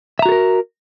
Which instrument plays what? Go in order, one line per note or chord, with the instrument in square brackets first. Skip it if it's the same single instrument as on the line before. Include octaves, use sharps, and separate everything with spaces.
[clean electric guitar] E5
A#5
F#4
A4
A#4